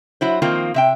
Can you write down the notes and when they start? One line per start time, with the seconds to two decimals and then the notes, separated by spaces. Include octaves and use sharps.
0.21 F#3 E4 C5
0.42 D#3 F3 A#3 C4 F4
0.74 C3 E5 G5